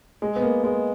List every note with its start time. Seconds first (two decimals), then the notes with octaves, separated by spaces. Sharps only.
0.22 G#3
0.36 B3
0.42 A#3
0.64 G#3